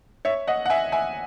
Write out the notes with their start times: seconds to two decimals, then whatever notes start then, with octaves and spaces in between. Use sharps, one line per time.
0.25 C#5 E5
0.47 D#5 F#5
0.66 F#5
0.70 E5 G#5
0.92 E5 G#5